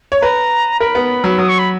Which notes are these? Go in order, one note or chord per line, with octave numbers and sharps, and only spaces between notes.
C#5
B4 A#5
A#4 B5
B3
F#3
F#3 D#6
C#6
B5